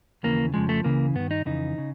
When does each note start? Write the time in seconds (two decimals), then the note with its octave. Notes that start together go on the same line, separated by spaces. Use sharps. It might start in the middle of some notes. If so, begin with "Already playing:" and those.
0.23 D#2 C#3 E3 A#3
0.54 F2 C#3 F3 G#3
0.69 A3
0.84 C#2 C#3 E3 A#3
1.15 G2 D#3 B3
1.31 D#4
1.45 F2 C#3 E3 D#4
1.78 C#3